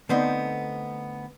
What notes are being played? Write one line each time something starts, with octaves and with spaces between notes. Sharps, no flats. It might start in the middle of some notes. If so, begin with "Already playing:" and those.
D3 A3 B3 C4 D#4